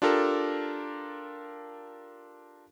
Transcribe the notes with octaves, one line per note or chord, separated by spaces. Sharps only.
D4 F4 G4 A4 A#4